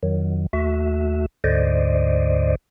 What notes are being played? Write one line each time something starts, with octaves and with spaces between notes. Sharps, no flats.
F2 D#3 F#3
D#2 A3 F#4 E5
D2 G#2 D3 C5 D5 D#5